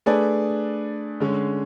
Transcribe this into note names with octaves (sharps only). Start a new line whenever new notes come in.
A3 D4 G#4 B4 D5
D3 G#3 C#4